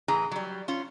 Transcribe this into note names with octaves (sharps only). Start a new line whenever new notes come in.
A2 E3 G#4 A#5
F#3 G3
C#4 F4